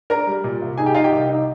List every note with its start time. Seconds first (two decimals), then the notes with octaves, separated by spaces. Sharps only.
0.10 D4 A#4 A#5
0.27 G3
0.44 A#2
0.62 C2
0.78 D#4 G#4 G#5
0.86 G4 G5
0.94 D#4 F4 F5
1.04 G4 G5
1.12 C2
1.29 D#4